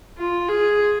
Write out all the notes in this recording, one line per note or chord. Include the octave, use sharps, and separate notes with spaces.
F4
G#4